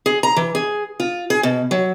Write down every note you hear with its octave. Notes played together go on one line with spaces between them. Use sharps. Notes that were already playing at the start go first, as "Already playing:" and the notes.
G#4
A#5
E3
G#4
F4
G#4
B2
F#3